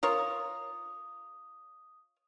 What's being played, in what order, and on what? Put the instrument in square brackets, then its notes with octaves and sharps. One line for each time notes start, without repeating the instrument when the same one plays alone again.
[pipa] F4 A#4 C#5 [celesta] D#6